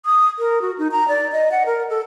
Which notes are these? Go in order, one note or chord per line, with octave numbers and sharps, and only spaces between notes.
D#6
A#4
F#4
D#4
A#5
D5
D#5
F#5
A#4
A4